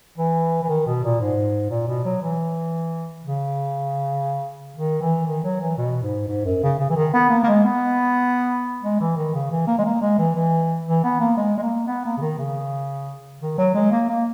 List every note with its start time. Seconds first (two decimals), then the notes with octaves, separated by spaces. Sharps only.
0.18 E3
0.63 E3
0.69 D#3
0.86 B2
1.04 A#2
1.20 G#2
1.70 A#2
1.88 B2
2.05 F#3
2.21 E3
3.24 C#3
4.77 D#3
5.01 E3
5.27 D#3
5.44 F#3
5.61 E3
5.77 B2
6.03 G#2
6.28 G#2
6.45 F#2
6.63 C#3
6.79 C#3
6.90 E3
6.96 D#3
7.14 B3
7.30 A#3
7.43 A#3
7.47 G#3
7.64 B3
8.83 G#3
9.00 E3
9.17 D#3
9.34 C#3
9.51 E3
9.67 A#3
9.78 G#3
9.85 A#3
10.02 G#3
10.18 E3
10.35 E3
10.87 E3
11.04 B3
11.20 A#3
11.37 G#3
11.58 G#3
11.62 A#3
11.88 B3
12.05 A#3
12.17 C#3
12.22 D#3
12.38 C#3
13.41 D#3
13.58 F#3
13.75 G#3
13.91 A#3
14.09 A#3